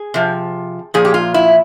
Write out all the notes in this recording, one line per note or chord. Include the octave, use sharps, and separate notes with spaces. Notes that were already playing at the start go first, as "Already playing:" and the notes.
Already playing: G#4
C3 F3
A#2 F3 G#4
G4
F4
E4